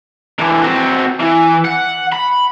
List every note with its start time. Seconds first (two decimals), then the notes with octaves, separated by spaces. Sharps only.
0.39 D3 E3
0.63 C4 F#4
1.20 E3
1.65 F#5
2.12 B5